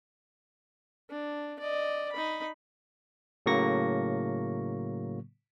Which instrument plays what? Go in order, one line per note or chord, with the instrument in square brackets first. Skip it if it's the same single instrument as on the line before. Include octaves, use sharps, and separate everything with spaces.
[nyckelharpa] D4
D5 D#5
D#4 B5
[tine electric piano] A2 C#3 F#3 A#3 C#6 A#6